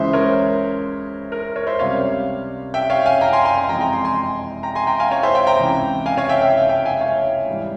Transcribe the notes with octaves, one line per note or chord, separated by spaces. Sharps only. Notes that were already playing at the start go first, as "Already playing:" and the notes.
Already playing: C#2 C#3 E3 G#3 C5 E5
A#4 C#5
A#4
A#4 C#5
C5 E5
C#2 C3 G3 C#5 F5
E5 G5
C#5 F5
F5 G#5
G5 A#5
G#5 C6
G#5 C6
G#5 C6
F2 C3 E3 G#3 G5 A#5
G5 A#5
G#5 C6
G#5 C6
G5 A#5
G#5 C6
G5 A#5
F5 G#5
C#5 F5
C5 E5
E5 G5
G5 A#5
C#2 C3 E3
F5 G#5
C#5 F5
E5 G5
E5 G5
E5 G5
F5 G#5
C#5 F5
G#2 E3 G3